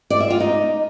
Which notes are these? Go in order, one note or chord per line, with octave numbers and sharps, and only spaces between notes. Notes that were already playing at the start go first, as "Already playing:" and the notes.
D5
E5
F4
D#4